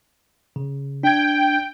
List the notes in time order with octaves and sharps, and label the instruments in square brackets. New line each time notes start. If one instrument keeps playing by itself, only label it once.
[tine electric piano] C#3
[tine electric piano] D4 G#6 [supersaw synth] G5